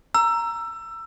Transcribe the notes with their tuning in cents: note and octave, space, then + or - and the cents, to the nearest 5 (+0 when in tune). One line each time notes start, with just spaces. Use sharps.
A#5 +0 E6 +20